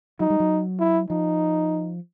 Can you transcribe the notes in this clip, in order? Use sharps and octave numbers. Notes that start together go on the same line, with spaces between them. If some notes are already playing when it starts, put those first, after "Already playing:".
F#3 D#4
G3
F#3
E4
F3 D#4